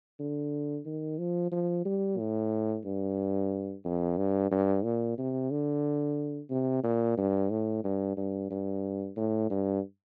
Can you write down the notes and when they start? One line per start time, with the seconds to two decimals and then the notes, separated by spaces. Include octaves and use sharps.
0.19 D3
0.86 D#3
1.18 F3
1.52 F3
1.85 G3
2.18 A2
2.85 G2
3.85 F2
4.17 G2
4.51 G2
4.84 A#2
5.18 C3
5.51 D3
6.50 C3
6.84 A#2
7.17 G2
7.50 A2
7.84 G2
8.17 G2
8.50 G2
9.16 A2
9.50 G2